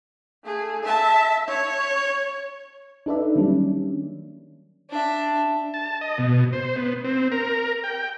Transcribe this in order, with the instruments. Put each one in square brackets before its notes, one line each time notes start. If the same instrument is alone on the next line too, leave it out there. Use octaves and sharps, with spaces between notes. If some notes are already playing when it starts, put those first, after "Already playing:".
[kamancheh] A3 G#4
E5 A5
C#5
[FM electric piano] D4 D#4 A4 B4 D5 E5
D#3 F#3 G3 A#3 C#4 D4
[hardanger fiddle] D4 E5
[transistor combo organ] A5
D#5
B2
C5
B3
C4
A#4
G5